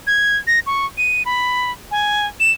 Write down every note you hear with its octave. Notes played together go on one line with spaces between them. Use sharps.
G#6
A#6
C#6
D#7
B5
G#5
E7